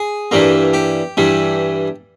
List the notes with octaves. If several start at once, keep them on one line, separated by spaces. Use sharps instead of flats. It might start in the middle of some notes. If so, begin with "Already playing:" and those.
Already playing: G#4
G2 E3 G3 A#3
G4
G2 E3 G3